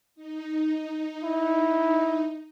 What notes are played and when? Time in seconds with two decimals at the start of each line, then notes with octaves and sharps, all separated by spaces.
0.15 D#4
1.24 E4